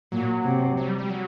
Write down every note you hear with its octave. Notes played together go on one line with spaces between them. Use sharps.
A#2 F#3
C3
F#3
G3
G3
F#3